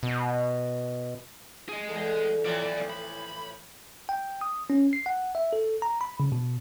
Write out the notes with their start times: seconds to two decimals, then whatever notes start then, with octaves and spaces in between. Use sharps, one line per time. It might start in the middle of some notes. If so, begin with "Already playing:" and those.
0.03 B2
1.69 G#4 D#5
1.89 E2 A4
2.45 B1 A2 E3 F3 D5
2.90 B5
4.09 G5
4.41 D#6
4.70 C#4
4.93 C7
5.06 F#5
5.35 E5
5.53 A4
5.82 A#5
6.01 B5
6.20 C#3
6.32 B2